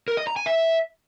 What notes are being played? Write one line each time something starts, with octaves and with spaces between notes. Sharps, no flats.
A#4
D#5
A#5
G#5
E5